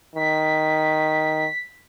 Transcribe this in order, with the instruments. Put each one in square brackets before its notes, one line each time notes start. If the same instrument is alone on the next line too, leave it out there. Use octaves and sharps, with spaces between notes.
[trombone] D#3 [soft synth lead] B6